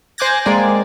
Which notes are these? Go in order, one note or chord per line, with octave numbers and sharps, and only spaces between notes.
C5 G#5 D6 F#6 G#6 A#6
G#3 A#3 C4 D5 G#5